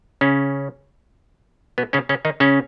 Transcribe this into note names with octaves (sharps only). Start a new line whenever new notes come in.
C#3 C#4
B2 B3
C#3 C#4
C#3 C#4
D#3 D#4
C#3 C#4